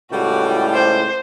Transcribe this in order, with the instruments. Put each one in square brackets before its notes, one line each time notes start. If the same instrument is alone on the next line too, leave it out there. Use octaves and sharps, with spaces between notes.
[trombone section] C#2 A2 [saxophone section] G3 [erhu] F#4
[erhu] C5